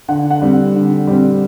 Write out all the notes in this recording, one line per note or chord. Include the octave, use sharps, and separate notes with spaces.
D3 F#5
F#5
G3 C4
D3
G3 C4